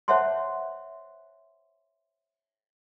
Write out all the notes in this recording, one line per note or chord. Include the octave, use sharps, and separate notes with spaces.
C5 C#5 E5 F#5 A5 C6